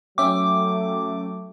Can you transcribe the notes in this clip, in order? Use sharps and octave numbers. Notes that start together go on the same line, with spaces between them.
F#3 A3 C#4 E5 G5 D6